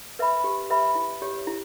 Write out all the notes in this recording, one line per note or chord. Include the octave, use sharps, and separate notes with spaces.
B4 E5 B5
G4
B4 E5 B5
E4
G4 C#5
E4